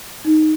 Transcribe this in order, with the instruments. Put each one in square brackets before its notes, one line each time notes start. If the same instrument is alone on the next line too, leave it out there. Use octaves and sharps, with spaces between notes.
[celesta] D#4